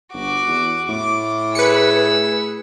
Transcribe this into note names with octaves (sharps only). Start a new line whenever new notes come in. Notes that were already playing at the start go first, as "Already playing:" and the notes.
G1 F#4 D6
E2
A2 D6
G#4 B4 E6 C#7